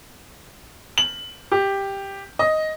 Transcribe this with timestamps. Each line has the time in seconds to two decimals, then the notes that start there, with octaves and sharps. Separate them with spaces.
0.98 F#7
1.52 G4
2.39 D#5